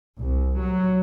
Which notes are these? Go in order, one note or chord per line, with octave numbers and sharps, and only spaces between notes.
C2
F#3